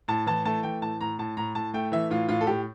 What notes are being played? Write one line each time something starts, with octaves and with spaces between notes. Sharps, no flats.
A2 A5
E3 A5
A3 A5
E3 G5
A2 A5
A2 A#5
A2 A5
A2 A#5
A2 A5
A3 G5
E3 E5
A2 F4
A2 F4
A4
A2 G4